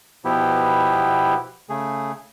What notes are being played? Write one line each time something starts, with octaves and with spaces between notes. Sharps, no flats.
B2 F3 B3 E4 G4
C#3 A3 G#4